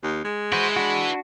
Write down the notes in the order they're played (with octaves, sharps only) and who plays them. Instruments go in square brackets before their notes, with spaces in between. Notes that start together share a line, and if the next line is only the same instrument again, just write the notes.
[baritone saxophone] D#2
G#3
[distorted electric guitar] E4 B4 [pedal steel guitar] F#4 C5
[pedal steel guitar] D4 F#4